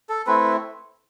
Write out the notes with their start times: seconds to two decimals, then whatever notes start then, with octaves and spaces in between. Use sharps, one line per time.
0.09 A4
0.27 A3 C4 E4 B4